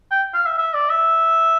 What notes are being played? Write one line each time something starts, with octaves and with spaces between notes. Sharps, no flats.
G5
F5
E5
E5
D5
E5